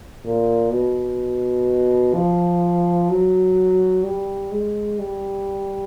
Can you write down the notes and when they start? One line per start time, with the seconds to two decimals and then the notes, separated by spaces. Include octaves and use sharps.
0.25 A#2
0.72 B2
2.14 F3
3.09 F#3
4.04 G3
4.51 G#3
4.98 G3